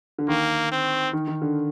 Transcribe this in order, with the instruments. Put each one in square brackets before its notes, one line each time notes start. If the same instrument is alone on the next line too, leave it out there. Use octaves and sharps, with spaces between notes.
[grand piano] D3
[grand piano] D#3 [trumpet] A#3
[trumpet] C4
[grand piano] D#3
D#3
D3